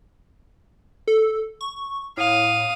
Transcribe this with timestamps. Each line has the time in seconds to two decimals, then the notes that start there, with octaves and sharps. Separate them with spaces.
1.08 A4
1.61 C#6
2.17 A2 F5 D#6